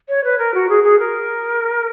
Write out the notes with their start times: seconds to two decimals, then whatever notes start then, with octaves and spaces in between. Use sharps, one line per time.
0.08 C#5
0.23 B4
0.38 A#4
0.54 F#4
0.69 G#4
0.83 G#4
0.99 A#4